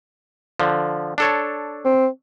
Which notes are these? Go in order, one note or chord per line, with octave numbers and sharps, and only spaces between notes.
D3 F3
D4 A4 C#5
C4